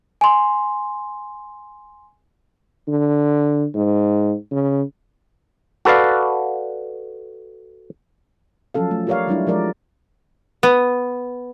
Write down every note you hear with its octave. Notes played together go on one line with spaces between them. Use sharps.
G#5 C6
D3
G#2
C#3
F#4 A4 B4 D5 F5
F3 F#3 C#4 A4 F5
A3
F4 G4 A#4 C#5 D5 F5
F#3 G3 D4 E4
F3 G#3 A#4 D5
B3